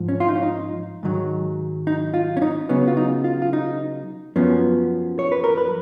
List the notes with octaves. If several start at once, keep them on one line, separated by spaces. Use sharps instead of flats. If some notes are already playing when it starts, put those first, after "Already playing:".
Already playing: G#2 F3
C#4
F4
D#4
C#4
D#4
G#2 D#3 F#3
D#4
F4
C#4
D#4
C#3 F#3 B3 C#4
F4
D#4
F4
F4
D#4
F#2 F3 B3 C#4
C#5
B4
A#4
B4